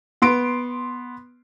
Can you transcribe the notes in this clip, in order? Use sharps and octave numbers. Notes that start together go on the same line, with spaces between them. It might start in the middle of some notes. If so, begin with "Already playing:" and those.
B3 C6 D7